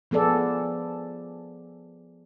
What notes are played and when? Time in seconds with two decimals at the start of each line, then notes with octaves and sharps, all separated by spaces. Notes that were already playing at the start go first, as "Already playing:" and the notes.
0.11 F3 B3 G#4 A4 D5